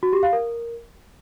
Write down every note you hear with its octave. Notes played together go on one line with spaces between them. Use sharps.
F#4
G4
F5
A#4